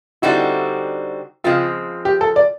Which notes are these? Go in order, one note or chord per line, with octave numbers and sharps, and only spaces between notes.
D3 G3 C4 D#4 E4 F#4
C#3 F3 G#3 C4 F4
G4
A4
D5